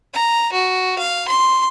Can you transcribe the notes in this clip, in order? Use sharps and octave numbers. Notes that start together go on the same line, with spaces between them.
A#5
F#4
F5
C6